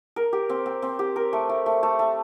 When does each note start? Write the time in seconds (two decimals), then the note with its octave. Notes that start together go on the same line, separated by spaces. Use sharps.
0.16 A#4
0.33 G4
0.50 C4
0.66 C4
0.82 C4
0.99 G4
1.16 A#4
1.33 A3
1.49 A3
1.66 A3
1.83 A3
1.99 A3